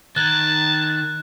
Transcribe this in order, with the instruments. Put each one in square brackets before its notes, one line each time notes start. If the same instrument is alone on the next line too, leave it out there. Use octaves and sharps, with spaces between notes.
[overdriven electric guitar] D#3 [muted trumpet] A5 [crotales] F#6 G#6